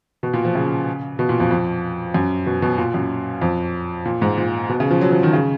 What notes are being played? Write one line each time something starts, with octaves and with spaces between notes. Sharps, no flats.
B2
A#2
F3
C#3
B2
A#2
F2
F2
F#2
B2
B2
A#2
F#2
F2
A#2
G#2
A#2
B2
C#3
F3
F#3
F3
D#3
C#3